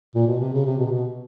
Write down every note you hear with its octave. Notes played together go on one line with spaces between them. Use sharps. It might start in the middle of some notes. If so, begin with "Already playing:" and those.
A#2
B2
C3
C#3
C3
B2
C3
B2